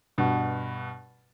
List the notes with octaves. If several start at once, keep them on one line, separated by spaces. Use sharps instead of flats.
G2 B2